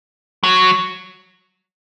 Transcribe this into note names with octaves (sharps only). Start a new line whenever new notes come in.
F#3